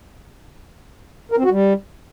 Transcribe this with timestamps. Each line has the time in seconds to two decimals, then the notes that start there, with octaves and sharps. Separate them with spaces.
1.32 A#4
1.38 C4
1.45 F#4
1.51 G3